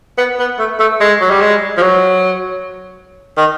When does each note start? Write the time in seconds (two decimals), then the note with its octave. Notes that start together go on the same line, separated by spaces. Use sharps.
0.18 B3
0.39 B3
0.59 A3
0.79 A3
1.00 G#3
1.21 F#3
1.31 G3
1.41 G#3
1.77 F3
1.82 F#3
3.37 D#3